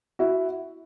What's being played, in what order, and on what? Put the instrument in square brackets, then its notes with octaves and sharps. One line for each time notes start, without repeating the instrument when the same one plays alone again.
[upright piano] E4 F#4